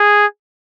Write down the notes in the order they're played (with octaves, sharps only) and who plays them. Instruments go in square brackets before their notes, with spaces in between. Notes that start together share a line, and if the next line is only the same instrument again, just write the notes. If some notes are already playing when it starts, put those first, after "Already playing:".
Already playing: [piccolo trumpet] G#4